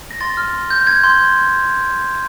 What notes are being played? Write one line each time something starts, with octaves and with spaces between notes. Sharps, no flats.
A#6
C6 A6
F6
C6
G6
G6 G#6
C6 G6